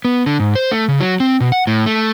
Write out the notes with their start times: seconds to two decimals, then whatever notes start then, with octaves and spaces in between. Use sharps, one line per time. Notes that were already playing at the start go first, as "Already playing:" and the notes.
0.05 B3
0.26 D3
0.40 G#2
0.55 C5
0.71 A3
0.88 C#3
1.01 F#3
1.20 C4
1.41 B2
1.52 F#5
1.67 A2
1.86 A3